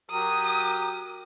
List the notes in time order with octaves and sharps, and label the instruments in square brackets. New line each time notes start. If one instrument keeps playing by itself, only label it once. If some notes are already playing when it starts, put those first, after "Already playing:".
[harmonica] F#3 G4 A#4 [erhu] D#6